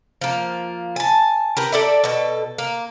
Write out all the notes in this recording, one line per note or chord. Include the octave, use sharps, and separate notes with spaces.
F3 A#3
G#5 A5
G4 A#4 B4
A4 D5 E5
B2 A4
A#3